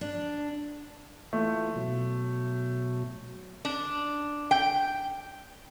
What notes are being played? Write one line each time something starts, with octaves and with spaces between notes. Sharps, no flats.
D4
E3 A3 F4
B2 F#3
D4
G5